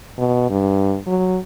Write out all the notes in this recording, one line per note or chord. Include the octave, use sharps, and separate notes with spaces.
B2
G2
F#3